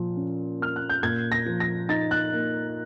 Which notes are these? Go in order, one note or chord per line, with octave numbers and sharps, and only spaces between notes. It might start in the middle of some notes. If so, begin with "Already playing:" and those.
Already playing: A#2 F3
C#4
A#3 F6
F#6
G6
A#2 G#6
A#6
F3
A#6
D#4 A6
F#6
A#3